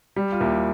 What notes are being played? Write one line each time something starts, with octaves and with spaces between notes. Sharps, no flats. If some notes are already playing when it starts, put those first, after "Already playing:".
G3
F4
D#2 E4